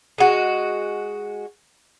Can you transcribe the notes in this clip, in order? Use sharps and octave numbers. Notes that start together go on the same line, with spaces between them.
G#3 F#4